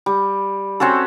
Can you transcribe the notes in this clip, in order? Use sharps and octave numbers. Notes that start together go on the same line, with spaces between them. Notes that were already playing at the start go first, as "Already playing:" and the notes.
G3
C4 C#4 F#4 A4